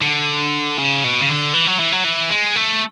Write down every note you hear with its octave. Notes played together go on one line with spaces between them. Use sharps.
D3
C#3
B2
C#3
D3
E3
F#3
E3
F#3
E3
G#3
A3